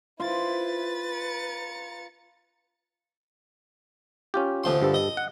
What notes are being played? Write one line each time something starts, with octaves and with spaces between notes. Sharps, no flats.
E4 F4 B4 C5 A6
A#5 C#7
C#4 F4 G4
D2 F3 C6
G2 G3 A4
D#5
F#5